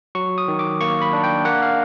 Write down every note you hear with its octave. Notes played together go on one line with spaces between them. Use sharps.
F#3 C#6
D#6
D#3
D6
A#3 C#6
B5
D4
G5
A#3 F#5
F5